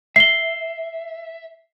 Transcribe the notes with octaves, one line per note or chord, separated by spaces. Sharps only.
E5 C7 G7